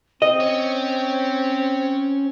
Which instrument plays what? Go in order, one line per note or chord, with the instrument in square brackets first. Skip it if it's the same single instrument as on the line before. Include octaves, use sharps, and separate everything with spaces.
[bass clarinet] C4 [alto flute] C5 [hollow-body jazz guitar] D#5
[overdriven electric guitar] C#4 C#5